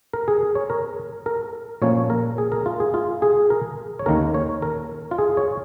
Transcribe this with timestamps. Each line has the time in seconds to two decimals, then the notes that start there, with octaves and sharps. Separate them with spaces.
0.13 A#4
0.28 G#4
0.55 C#5
0.70 A#4
1.26 A#4
1.82 A#2 F3 A#3 C#4 C#5
2.10 A#4
2.38 G#4
2.52 A#4
2.66 F4
2.80 G#4
2.94 F4
3.22 G#4
3.50 A#4
3.99 C#5
4.06 D#2 D#3 A#3 C#4 A#4
4.34 C#5
4.62 A#4
5.11 F4
5.18 G#4
5.37 C#5